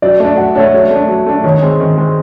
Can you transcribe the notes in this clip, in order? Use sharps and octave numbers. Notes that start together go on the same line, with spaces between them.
F#3 D5
A3 D4 D5
F#3 F#5
A3 D4 C#5
F#3 C#5
A3 D4
F#3
A3 D4
D#3 C#5
G#3 C4
D#3
G#3 C4